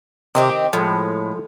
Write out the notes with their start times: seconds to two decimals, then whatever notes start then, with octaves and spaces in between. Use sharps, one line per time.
0.35 C3 D#3 C4 G4
0.49 G5
0.73 A2 F3 G#3